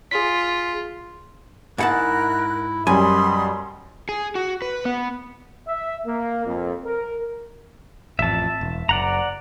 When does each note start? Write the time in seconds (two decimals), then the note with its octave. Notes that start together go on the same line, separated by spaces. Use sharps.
0.11 F4 G#4 B6
1.78 G#2 E4 A#4 F#5 A5 F#6
2.87 F#2 B2 G3 G#5 B5 C6 D#6
4.09 G#4
4.35 F#4
4.62 B4
4.85 B3
5.66 E5
6.05 A#3
6.45 F2
6.84 A#4
8.19 A1 F2 E5 A5
8.61 E1
8.89 F#1 D5 F#5 A#5